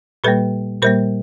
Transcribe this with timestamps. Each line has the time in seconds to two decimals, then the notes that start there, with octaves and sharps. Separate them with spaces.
0.24 A#2 G3 A#3 A4 B4
0.82 A#2 G3 A#3 A#4 C5